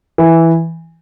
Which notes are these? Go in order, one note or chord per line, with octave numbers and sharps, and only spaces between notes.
E3